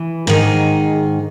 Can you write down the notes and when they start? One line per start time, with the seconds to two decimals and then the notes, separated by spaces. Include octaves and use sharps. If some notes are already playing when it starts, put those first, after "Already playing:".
Already playing: E3
0.27 G#2 D#3 G#4